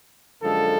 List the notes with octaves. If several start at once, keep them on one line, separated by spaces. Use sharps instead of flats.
F#2 D3 F3 G#3 A4